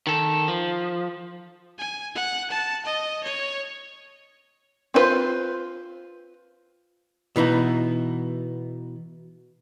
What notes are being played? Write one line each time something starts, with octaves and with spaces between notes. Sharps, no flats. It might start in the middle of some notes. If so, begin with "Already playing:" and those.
D#3 A4
F3
G#5
F#5
A5
D#5
C#5
C4 D4 F4 B4 C5
B2 E3 B3 D#4